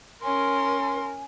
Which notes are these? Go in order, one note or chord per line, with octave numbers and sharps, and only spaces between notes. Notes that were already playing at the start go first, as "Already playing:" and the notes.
C#4 A#4 G#5 C6